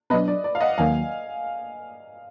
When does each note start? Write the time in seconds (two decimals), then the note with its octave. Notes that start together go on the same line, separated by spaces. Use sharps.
0.10 B2 F#3 D4 B4 D#5
0.28 D5
0.44 D5
0.55 F5
0.61 D#5 F#5
0.78 D#2 D#3 F#3 A#3 F5 G#5